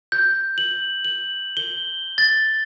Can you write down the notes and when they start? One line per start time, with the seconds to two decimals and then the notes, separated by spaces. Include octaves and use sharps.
0.12 G6
0.58 F#7
1.05 F#7
1.57 G7
2.18 A6